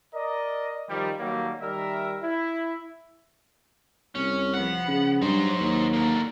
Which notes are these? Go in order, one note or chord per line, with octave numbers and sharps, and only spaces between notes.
A#4 D5 D#5
D#3 F3 G3
D#3 F#3 G3 A3 A#3
D#3 G3 A#4 E5
E4
C2 C#4
F3 B3 F#5
C#3
G2 F#3 D#4 C5
D#2
D3 A#3